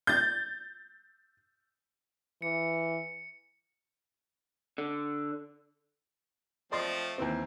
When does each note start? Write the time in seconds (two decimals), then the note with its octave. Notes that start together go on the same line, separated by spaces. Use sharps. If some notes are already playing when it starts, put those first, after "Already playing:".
0.07 G6 A6
2.42 E3 C#7
4.78 D3
6.72 F3 A3 C4 D5 D#5 C6
7.18 D#2 E3 C4